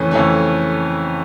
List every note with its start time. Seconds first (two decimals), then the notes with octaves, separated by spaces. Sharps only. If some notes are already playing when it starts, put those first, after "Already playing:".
Already playing: F2 C#3 E3 A3 C#4
0.11 F2 C#3 E3 A3 C#4